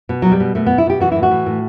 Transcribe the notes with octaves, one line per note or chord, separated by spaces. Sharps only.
B2
B2 F#3
G3
B2
B2 A3
B2 B3
E4
B2 G4
E3 F#4
A2 E4
F#4
E3
A2